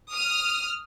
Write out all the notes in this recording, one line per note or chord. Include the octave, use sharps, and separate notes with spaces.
D#6 F6